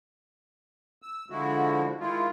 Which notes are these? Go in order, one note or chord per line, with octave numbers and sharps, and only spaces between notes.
E6
D3 F3 G#3 E4 F#4
D#3 G#3 E4 F4